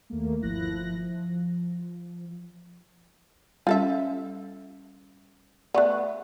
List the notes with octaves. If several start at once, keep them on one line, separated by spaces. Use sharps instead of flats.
D#2 A3 A#3
G1 F3 E4 F#6 A#6
F3
G3 C#4 F4 A4 E5
A3 B3 D5 C#6 F#6